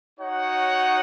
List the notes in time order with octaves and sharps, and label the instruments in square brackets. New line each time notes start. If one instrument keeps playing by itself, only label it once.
[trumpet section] D#4 F#4 C#5 F#5